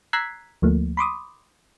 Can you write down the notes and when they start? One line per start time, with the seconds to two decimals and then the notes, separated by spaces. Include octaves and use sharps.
0.13 A#5 E6 F#6 G#6 B6 C7
0.62 D2 F3 A3 A#3
0.97 B5 C6 D6 D#6